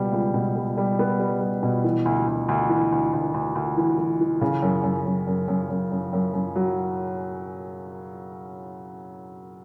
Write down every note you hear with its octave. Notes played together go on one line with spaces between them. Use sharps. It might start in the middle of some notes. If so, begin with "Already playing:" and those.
Already playing: C#2 B2 G3 B3
C#2
B2
G3
G3
B3
G3
G3
B2
E3
D2
D2
D2
E3
D2
D2
D2
D2
E3
E3
E3
C#3
F#2
F#2
F#2
F#2
F#2
F#2
F#2
F#2
F#2
F#3